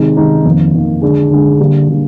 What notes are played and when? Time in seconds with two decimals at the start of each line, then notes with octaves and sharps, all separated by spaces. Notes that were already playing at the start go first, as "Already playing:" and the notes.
Already playing: C3 D#3 G#3 D#4
0.17 C3 D#3 G#3 D#4
0.45 F2 D#3 A#3
0.74 F2 D#3 A#3
1.02 D3 G#3 D4 G#4
1.31 D3 G#3 D4 G#4
1.60 D3 G3 A#3
1.88 D3 G3 A#3